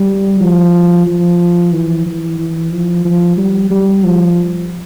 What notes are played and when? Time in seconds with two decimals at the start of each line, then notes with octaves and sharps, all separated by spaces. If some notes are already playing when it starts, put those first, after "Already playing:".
Already playing: G3
0.41 F3
1.06 F3
1.73 E3
2.06 E3
2.39 E3
2.72 F3
3.05 F3
3.37 G3
3.70 G3
4.04 F3